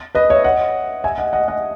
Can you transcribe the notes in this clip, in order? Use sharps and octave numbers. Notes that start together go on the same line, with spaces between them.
B4 D#5
C#5 E5
D#5 F#5
E5 G#5
D#5 F#5
D#5 F#5
D#5 F#5